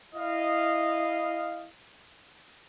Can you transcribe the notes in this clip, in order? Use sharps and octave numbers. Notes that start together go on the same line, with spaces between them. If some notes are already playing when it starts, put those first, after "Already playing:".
E4 D#5 F5